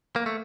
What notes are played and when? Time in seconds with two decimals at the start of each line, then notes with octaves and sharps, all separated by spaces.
0.16 A#3
0.26 A3